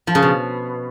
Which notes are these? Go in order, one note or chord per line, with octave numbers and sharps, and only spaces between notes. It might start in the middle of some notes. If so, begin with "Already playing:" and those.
F3
C#3
B2